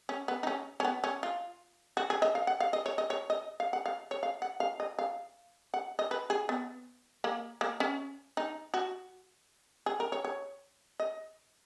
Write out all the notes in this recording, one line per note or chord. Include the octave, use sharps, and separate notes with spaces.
C#4
B3
D#4
C#4
C#4
B3
C#4
F4
F#4
G#4
D#5
F5
F#5
F5
D#5
C#5
D#5
C#5
D#5
F5
F#5
F5
C#5
F5
F#5
F5
D#5
F5
F#5
D#5
B4
G#4
B3
A#3
A#3
C#4
D#4
F#4
G#4
A#4
C#5
C#5
D#5